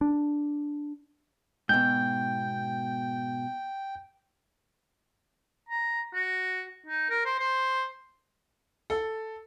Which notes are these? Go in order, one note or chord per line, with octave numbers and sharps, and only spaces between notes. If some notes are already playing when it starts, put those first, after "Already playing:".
D4
G#2 B2 G5 G6
A#5
F#4
D#4
A#4
C5
C5
A4